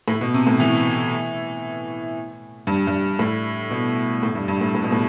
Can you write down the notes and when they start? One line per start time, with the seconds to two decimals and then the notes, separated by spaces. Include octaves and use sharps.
0.08 A2
0.21 B2
0.34 C3
0.47 A2
0.60 E3
2.67 G2
2.87 G2
3.19 A2
3.71 B2
4.23 A2
4.35 G2
4.48 G2
4.61 A2
4.75 A2
4.83 B2
4.92 A2